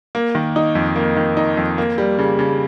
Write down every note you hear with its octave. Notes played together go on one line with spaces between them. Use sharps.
A#3
D#3
D#4
F2
A#3
D#3
D#4
F2
A#3
G3
C#3
C#3